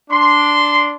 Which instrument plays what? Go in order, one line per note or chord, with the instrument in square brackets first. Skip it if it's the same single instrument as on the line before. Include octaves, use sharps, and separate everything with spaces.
[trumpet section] D4 C6